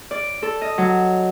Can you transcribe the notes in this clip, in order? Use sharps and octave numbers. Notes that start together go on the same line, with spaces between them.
D5
A4
D#5
F#3